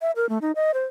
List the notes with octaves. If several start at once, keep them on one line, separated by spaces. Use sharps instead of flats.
E5
A#4
A3
D#4
D#5
C5